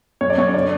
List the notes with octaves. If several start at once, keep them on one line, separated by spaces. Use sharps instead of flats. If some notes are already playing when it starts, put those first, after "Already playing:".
F#2 C#5
D5
F#2 C#5
C#5
D3 D5